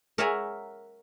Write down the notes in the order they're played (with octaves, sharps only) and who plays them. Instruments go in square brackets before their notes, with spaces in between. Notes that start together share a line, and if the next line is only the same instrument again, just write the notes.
[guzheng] A#4 C#5 E5 F#5 G#5 A#5